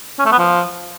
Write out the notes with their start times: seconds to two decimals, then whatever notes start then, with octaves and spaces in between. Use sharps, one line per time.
0.19 C#4
0.26 A3
0.32 B3
0.39 F3